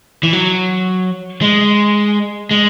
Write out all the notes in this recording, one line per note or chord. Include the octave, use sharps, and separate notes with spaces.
E3
F#3
G#3
G#3